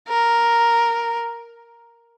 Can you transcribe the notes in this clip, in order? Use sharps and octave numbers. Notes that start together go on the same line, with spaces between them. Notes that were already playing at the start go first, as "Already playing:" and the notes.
A#4